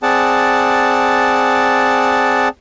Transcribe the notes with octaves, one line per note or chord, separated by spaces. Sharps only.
C4 G#4 D5 F#5 A5